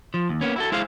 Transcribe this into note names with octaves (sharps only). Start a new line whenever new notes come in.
F3
D#2
A#3 B3 C#4
E4 F#4 A4
G#3 E4 G#4 C5 F5